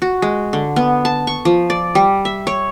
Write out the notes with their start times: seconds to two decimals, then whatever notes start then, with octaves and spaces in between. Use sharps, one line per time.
0.02 F#4
0.22 G#3
0.53 D3
0.76 B3
1.05 A5
1.27 C#6
1.45 F3
1.70 D5
1.95 G3
2.25 E5
2.47 C#5